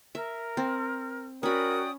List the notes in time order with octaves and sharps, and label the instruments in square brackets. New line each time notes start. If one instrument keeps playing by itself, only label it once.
[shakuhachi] A#4 [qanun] E5
[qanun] C4
[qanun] C#4 B5 [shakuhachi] F#4 [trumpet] A#4 [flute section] D5 G5 D#6